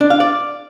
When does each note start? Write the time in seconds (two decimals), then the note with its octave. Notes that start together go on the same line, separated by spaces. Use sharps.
0.01 D4
0.10 F5
0.20 D5